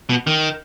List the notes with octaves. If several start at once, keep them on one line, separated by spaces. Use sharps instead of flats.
B2
D#3